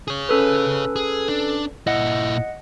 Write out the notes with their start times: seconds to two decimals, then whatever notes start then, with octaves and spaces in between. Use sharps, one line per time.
0.08 G#4 C#5
0.29 C#4 A4 B4
0.96 G#4
1.29 D4
1.87 A#2 E4 D#5 F#5